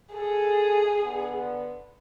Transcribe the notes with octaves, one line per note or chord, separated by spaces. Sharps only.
G#4 A4
D3 B3